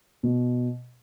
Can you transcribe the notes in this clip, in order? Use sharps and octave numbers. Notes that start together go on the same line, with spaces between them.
B2